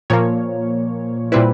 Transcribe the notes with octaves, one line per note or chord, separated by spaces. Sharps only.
A#2 F3 A#3 C#5
A#2 G3 C4 E4 B4